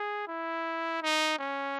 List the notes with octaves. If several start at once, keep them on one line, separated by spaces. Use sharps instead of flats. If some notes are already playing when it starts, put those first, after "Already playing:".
Already playing: G#4
E4
D#4
C#4